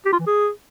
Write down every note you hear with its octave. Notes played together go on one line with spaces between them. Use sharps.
G4
F4
E3
G#4